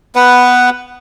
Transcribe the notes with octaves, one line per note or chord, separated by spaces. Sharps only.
B3 B4 F#5